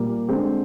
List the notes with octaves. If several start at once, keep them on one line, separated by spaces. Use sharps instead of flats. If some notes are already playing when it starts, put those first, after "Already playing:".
Already playing: A#2 G3 A#3
D3 G#3 C4